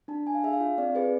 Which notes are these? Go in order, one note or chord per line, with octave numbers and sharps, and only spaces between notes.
D4 A5
D4 G#5
F5
G#4 E5
F5
F4
C4 D5
G#4 B4